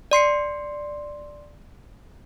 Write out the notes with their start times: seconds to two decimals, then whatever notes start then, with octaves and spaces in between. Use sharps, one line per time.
0.11 D5 C6 C7 C#7